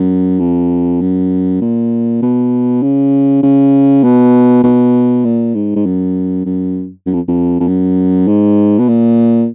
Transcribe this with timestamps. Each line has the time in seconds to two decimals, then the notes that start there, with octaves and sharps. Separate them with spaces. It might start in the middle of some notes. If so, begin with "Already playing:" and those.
Already playing: F#2
0.40 F2
1.01 F#2
1.61 A#2
2.22 B2
2.83 C#3
3.43 C#3
4.04 B2
4.64 B2
5.25 A#2
5.55 G#2
5.76 G#2
5.86 F#2
6.46 F#2
7.07 F#2
7.13 F2
7.28 F2
7.60 F2
7.68 F#2
8.28 G#2
8.79 B2
8.88 A#2